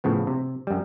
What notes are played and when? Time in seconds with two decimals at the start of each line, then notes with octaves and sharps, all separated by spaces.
0.04 A2 C#3 F3 B3
0.27 C3
0.67 F#2 G3